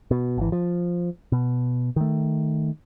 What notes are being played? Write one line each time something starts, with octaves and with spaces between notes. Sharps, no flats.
B2
G#1 E3
F3
B2
D#3 A3